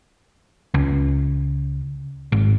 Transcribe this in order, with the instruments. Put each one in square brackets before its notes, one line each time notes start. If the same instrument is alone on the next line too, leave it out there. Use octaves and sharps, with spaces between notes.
[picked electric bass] C#2
G#1